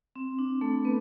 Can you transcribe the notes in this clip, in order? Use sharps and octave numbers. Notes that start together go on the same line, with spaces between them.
C4
D4
A3 A4
B3 B4